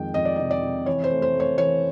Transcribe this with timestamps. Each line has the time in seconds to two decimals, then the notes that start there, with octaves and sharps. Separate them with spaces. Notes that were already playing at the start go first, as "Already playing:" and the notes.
Already playing: F2 D#3 G#3 G5
0.14 F2 D#5
0.25 D5
0.36 C3 D#5
0.51 D5
0.63 C3
0.86 E3 C#5
1.04 C5
1.11 A3
1.22 C5
1.35 A3
1.40 C#5
1.58 E3 C#5